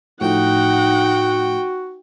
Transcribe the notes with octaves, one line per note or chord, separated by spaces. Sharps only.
A2 F3 A3 D#4 F#4 F#5 G5